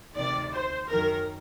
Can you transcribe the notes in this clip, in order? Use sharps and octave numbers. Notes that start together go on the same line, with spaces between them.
D2 C3 D#3 D5
C5
F#2 D#3 A#4